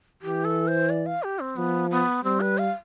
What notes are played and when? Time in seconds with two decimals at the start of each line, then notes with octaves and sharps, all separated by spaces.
0.22 E3 G4
0.45 A4
0.67 C5
0.90 D5
1.06 F5
1.23 G4
1.40 C4
1.56 F3 B3
1.91 B3
2.24 G3 C4
2.41 B4
2.58 F5